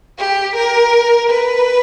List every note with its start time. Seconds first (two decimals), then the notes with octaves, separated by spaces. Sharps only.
0.18 G4
0.55 A#4
1.29 B4